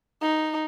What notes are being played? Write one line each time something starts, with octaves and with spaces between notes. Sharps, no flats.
D#4